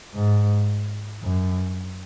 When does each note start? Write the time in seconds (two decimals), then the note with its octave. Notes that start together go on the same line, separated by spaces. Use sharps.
0.14 G#2
1.23 F#2